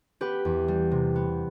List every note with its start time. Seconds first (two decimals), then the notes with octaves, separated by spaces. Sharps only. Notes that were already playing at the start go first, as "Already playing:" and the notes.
0.21 B3 G4 B4
0.45 E2
0.68 G3
0.91 C3
1.15 B3